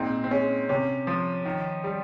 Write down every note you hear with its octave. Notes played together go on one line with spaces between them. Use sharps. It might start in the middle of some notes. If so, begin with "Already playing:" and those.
Already playing: A#2 G#3 C4 D#4
C4
G#3 C#4
C3 C#4
F3
D#3
G3